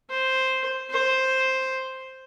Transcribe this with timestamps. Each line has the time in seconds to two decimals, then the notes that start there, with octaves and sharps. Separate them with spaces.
0.10 C5
0.90 C5